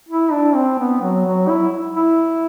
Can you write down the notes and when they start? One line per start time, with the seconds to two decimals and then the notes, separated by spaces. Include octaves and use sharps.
0.09 E4
0.32 D4
0.55 C4
0.79 B3
1.02 F#3
1.26 F#3
1.49 E4
1.95 E4